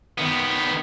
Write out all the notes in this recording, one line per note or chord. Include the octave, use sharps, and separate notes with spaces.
D#3 B3